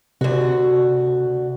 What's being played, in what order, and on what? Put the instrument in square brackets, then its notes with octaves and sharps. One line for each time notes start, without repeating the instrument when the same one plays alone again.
[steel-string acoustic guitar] D2 F#4 [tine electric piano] C3